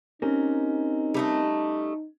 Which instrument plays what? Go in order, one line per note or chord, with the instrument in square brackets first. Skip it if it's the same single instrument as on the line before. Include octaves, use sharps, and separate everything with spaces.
[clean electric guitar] C4 G4 A#4 [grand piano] C#4 [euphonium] D#4
[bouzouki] G3 A3 D#5